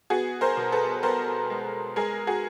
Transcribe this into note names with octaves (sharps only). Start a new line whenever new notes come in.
B3 F#4 G#4
A#4 C5
B2
A4 B4
B3 A#4 C5
G#3
G#3 G#4 A#4
F#4 G#4